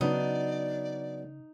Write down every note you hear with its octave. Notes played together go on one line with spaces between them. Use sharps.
C#3 F#3 B3 D4 D#4 D5